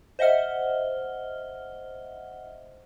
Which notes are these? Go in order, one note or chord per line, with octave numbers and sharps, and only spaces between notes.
C5 D#5 E5 F#5 F6 G7